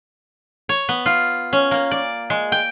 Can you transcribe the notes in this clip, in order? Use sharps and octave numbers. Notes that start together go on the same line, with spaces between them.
C#5
B3
F4
C#4
A#3
D5
G#3
G5